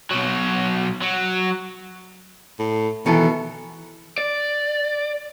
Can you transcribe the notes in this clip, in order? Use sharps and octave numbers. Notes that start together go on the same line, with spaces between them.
B1 F#3
F#3
A2
B2 D#3 E3 A4
D5